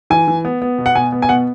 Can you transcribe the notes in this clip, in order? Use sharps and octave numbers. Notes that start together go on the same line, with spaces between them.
E3 G#5
E3
B3
B3
B2
F#5
B2 G#5
B3
G#5
B2 F#5